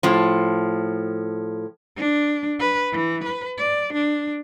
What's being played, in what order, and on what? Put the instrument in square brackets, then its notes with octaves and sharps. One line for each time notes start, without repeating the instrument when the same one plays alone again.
[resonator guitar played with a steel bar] A2 F3
[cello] D4
B4
E3
B4
D5
D4